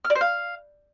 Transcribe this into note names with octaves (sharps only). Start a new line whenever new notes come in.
F6
D5
C5
F5